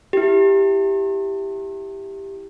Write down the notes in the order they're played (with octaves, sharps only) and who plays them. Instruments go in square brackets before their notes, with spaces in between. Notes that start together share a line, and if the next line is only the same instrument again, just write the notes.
[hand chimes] E4 G4